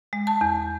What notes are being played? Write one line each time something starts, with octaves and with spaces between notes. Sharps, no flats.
G#3
A5
E2